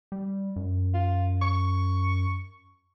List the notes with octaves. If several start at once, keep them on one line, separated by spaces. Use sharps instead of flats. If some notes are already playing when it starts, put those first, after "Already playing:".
G3
F#2
F4
C#6